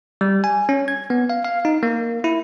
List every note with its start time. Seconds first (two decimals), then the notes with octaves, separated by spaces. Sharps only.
0.21 G3
0.44 G#5
0.69 C#4
0.88 G#6
1.10 B3
1.30 F5
1.44 F5
1.65 D#4
1.83 A#3
2.24 E4